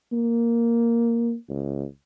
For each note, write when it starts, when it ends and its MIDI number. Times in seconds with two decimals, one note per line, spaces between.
0.12 1.34 58
1.49 1.85 37